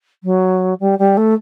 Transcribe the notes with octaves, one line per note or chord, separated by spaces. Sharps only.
F#3
G3
G3
A3